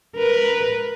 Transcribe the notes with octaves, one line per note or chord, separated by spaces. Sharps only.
A#4 B4